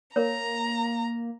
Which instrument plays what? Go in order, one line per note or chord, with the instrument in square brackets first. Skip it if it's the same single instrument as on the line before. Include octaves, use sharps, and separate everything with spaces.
[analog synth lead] A#3 [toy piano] A#4 C#5 [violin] A#5